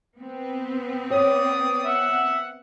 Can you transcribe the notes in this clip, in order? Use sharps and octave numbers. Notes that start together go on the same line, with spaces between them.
B3 C4
C#5 D5 D#6
E5 F#5